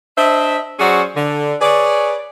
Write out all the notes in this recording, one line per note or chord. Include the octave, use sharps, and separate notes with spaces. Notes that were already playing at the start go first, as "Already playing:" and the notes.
D4 C5 D#5 E5
F#3 C#4 F#4 G#4 C5 D5
D3
G#4 B4 C#5 D5